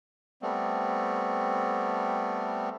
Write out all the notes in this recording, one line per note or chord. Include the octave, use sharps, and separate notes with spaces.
G3 A3 B3 C4